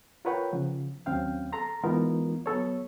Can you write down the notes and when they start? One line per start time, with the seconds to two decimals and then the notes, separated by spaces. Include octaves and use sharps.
0.25 F4 A#4 B4 C#5 F#5 G5
0.53 C#3 F3
1.06 D#2 F#3 C4 C#4 F5 G5
1.52 A4 A5 A#5 C6
1.84 E3 G#3 B3 D#4 F4 A#4
2.46 F#3 B3 A4 C#5